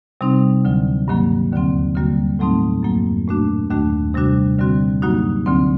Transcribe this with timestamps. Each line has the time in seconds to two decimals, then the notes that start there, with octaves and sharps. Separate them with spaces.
0.21 C3 G3 C4 D#4
0.65 D2 D3 F#3
1.08 G2 D#3 F#3 A#3
1.52 D#2 D3 F#3 C4
1.95 D3 G3 A#3 F#4
2.39 A2 F#3 A3 C4 D#4
2.83 F#2 F#3 A#3
3.28 A#2 A3 D4 F#4
3.71 D#2 D#3 A3 D4 F#4
4.14 C3 G3 D4 F#4
4.59 D3 G3 C4 F#4
5.02 G2 F#3 A#3 D#4 F#4
5.46 D2 D3 F#3 C4